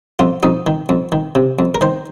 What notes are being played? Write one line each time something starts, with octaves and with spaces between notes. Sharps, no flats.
F2 F4
F2 D#4
D#3
F2
D#3
C3
F2
A#4
D#3 C5